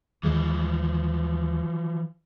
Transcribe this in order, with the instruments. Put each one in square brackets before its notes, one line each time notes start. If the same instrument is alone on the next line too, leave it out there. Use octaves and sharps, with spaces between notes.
[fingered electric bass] D#2 G#3 [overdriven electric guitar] E3 F3